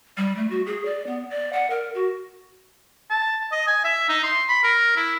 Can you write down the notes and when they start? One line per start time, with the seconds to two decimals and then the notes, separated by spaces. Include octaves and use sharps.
0.17 G3
0.36 A3
0.50 F#4
0.66 G#4
0.85 D5
1.06 B3
1.30 D5
1.53 F#5
1.70 A#4
1.95 F#4
3.10 A5
3.52 D#5
3.67 G#5
3.84 E5
4.09 D#4
4.23 C6
4.49 B5
4.63 A#4
4.96 E4